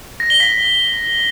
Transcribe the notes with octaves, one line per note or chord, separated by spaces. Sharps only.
A#6
G7
B6